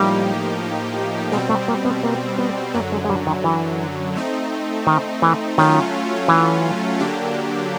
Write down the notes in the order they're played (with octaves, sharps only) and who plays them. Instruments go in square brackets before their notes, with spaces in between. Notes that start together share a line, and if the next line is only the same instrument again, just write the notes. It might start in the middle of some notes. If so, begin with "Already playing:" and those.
Already playing: [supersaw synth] A2 F3 A#3 D#4 G4 [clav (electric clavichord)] G3
[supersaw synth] B2 G3 C4 [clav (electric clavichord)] G#3
[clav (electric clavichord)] A3
A#3
B3
A#3
B3
[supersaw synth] F#2 D3 F#3 [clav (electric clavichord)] A#3
[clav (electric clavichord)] G#3
G#3
G3
D#3
E3
[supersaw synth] A3 C4 D#4
[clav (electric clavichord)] D#3
E3
[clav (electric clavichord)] D#3 [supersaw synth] F#3 A3 C#4 F4
[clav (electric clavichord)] E3
[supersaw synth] D3 F#3 A#3 D4 G4